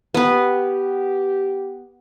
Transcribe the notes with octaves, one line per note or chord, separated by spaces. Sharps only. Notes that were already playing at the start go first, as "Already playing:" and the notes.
B3 G4 B4